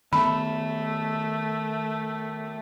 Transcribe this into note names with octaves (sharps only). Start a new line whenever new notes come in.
D#3 A3 B3 B5